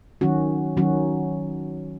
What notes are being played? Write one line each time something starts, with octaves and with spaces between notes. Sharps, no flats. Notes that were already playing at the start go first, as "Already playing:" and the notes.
D#3 F#3 C#4 F#4
D#3 F#3 C#4 F#4